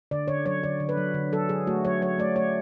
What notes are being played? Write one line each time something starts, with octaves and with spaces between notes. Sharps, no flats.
D3 D5
D3 C#5
F#3 C#5
D3 D5
D3
B4
F#3
D3
F#3 A4
F#3 G#4
A3 F#4
F#3 C#5
F#3 C#5
A3 D5
A3 C#5